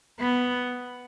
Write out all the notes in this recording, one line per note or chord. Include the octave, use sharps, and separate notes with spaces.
B3